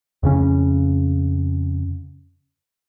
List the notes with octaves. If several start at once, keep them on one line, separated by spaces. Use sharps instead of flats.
F2 C#3 C#4